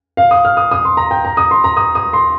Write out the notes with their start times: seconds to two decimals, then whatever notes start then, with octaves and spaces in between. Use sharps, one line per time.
0.17 F5
0.31 D#6
0.45 F6
0.57 D#6
0.71 D#6
0.85 C6
0.97 A#5
1.11 G5
1.25 A#5
1.37 D#6
1.51 C6
1.64 A#5
1.77 D#6
1.95 D#6
2.13 C6